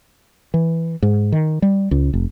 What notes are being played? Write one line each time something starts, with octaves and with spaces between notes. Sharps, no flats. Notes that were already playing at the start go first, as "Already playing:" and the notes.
E3
G#2
D#3
G3
C#2
F1